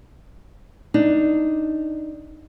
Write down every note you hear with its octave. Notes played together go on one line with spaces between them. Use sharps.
D4 D#4